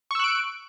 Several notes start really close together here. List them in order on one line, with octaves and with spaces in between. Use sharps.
C#6 E6 F#6 D7